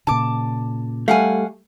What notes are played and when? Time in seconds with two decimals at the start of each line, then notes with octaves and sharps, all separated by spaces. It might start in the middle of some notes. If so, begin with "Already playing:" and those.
0.07 A#2 C#3 A5 D6
1.08 G3 A3 F5 F#5 G#5